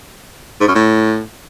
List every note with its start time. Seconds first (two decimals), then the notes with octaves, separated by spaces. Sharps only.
0.61 G#2
0.68 F#2
0.75 A2